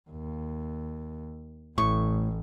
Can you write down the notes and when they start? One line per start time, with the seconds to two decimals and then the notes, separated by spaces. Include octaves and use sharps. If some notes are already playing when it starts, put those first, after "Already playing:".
0.10 D#2
1.78 A1 A2 C#6